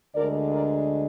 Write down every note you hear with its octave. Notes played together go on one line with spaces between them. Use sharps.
D2 D3 G#3 A#4 D5
A#4 D5